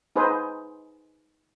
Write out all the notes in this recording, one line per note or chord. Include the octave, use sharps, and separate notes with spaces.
D#4 G#4 B4 C5